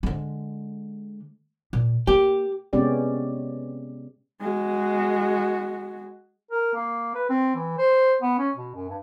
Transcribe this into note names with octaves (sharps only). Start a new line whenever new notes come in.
D3 G#3
A#2
A#3 G4
C3 G#3 B3 C#4 G4 D5
G#3 F#4
A#4
A#3
B4
C4
E3
C5
B3
C#4
B2
F#2
G2